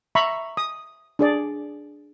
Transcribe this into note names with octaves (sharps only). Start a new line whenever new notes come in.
E5 A#5 B5 C#6
D#6
D4 G#4 D5